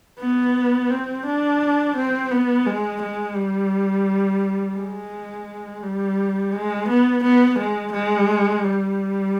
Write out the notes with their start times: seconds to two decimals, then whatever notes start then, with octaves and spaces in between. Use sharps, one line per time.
0.19 B3
0.90 C4
1.26 D4
1.96 C4
2.31 B3
2.66 G#3
3.02 G#3
3.36 G3
4.76 G#3
5.83 G3
6.52 G#3
6.88 B3
7.24 B3
7.59 G#3
7.93 G#3
8.64 G3